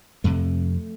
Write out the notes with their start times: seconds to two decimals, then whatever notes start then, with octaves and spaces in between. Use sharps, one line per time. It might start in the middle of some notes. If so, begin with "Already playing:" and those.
0.24 F2 C3 A3